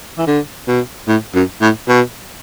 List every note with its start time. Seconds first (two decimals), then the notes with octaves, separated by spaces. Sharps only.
0.18 E3
0.27 D3
0.68 B2
1.08 A2
1.35 F#2
1.61 A2
1.89 B2